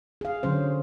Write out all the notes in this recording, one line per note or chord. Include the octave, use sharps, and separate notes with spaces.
G#4 F5
D3 F#3 C#4 C5